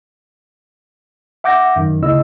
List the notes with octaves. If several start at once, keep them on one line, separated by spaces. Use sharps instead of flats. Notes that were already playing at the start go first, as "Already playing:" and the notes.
E5 F#5 D6 G6 A#6
F#2 D#3
D2 C#3 E4 D#5 E6